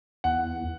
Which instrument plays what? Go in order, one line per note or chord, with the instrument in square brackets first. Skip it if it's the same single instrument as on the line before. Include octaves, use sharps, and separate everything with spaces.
[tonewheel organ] E2 [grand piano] F#5